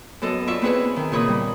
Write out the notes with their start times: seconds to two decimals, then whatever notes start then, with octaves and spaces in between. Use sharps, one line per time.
0.21 F#2 B3 A4 D#5
0.47 F4 D5 E5 C#6
0.62 B3 C4 E4 G#4 B4 C#5
0.96 D#3
1.12 A#2 C#3 C#5 B5 D#6
1.28 G3